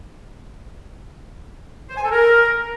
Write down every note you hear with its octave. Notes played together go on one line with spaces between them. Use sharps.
C5
G#5
A4
A#4